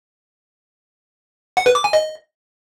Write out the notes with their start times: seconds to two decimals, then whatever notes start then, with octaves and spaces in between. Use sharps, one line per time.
1.57 F#5
1.66 B4
1.75 D6
1.84 G#5
1.93 D#5